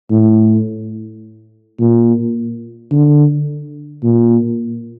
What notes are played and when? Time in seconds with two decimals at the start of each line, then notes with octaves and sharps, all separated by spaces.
0.11 A2
1.79 A#2
2.92 D3
4.04 A#2